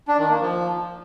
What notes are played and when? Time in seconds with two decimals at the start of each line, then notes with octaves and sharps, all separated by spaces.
0.08 D4
0.19 D#3
0.30 A#3
0.40 F3